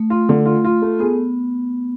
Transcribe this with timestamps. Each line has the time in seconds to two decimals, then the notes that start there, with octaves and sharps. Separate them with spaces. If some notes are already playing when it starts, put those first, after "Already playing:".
Already playing: A3
0.10 F4
0.29 D3
0.46 F4
0.64 F4
0.82 A3
0.99 B3 G#4